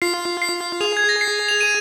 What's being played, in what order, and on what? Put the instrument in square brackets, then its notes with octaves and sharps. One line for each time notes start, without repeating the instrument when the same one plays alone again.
[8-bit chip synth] F4 [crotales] C7
[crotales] C7
[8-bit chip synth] G#4 [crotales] F7
[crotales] G#6
A#6
C7
F7
D#7